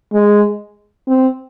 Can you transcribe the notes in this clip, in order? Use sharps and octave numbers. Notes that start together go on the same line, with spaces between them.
G#3
C4